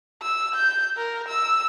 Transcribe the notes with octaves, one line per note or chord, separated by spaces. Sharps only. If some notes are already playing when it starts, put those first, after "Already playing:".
E6
G6
A#4
E6